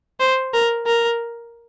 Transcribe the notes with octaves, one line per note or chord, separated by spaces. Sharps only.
C5
A#4
A#4